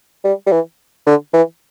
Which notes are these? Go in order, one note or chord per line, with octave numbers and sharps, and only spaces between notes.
G3
G3
E3
D3
E3